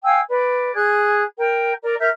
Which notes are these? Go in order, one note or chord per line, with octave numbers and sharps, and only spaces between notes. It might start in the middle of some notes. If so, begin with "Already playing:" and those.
F5 G5 G#5 E6
B4 D5
G#4 F#6 G#6
A#4 G5
A#4 D5
A#4 E5 F6 G6